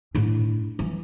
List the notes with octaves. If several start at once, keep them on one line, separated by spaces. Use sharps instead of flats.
A2 D4
E3